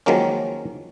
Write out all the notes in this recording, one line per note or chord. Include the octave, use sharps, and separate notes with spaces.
D#3 F3 F#3 G#3 A#3 C#4